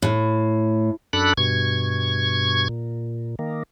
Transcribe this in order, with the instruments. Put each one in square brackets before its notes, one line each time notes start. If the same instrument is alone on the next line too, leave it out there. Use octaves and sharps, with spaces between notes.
[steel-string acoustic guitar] A2
[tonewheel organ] F#2 D4 A4 B5 F#6
G2 B2 C#6 G#6
A#2
D#3 A#3